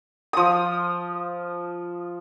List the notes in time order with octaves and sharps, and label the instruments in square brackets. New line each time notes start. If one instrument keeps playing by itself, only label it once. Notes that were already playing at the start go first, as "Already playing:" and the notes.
[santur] F3 D#6